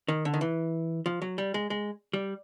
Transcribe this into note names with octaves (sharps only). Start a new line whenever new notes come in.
D#3
D3
D#3
E3
F3
F#3
G3
G#3
G#3
G3